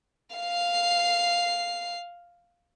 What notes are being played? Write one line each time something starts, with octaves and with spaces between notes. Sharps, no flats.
F5 C7